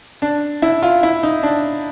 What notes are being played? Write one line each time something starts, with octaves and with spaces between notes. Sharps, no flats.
D4
E4
F4
E4
D#4
D4